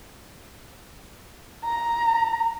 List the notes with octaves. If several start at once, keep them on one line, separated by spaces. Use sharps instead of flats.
A#5